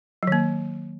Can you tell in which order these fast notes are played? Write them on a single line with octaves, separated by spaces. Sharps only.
F#3 D#3 A#3